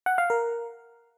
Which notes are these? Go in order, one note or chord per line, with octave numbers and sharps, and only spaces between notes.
F#5
F5
A#4